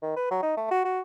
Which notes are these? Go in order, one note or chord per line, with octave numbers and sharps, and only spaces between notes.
D#3
B4
F#3
D#4
A3
F#4
F#4